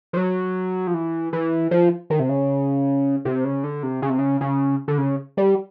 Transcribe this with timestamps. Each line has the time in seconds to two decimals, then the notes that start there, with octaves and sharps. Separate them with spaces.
0.13 F3
0.17 F#3
0.87 F3
0.94 E3
1.33 E3
1.71 F3
2.10 D#3
2.20 C3
2.29 C#3
3.25 C3
3.45 C#3
3.64 D3
3.83 C3
4.02 C#3
4.10 C3
4.19 C#3
4.41 C#3
4.88 D3
4.98 C#3
5.37 G3